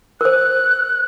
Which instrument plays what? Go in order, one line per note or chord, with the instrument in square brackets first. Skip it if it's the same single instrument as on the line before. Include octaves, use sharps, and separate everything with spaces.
[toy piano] A#4 C5 [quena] F#6